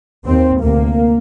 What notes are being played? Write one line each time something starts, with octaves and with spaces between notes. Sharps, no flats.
D#2 C4
D2 C3 A#3